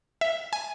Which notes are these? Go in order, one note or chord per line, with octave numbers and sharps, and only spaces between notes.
E5
G#5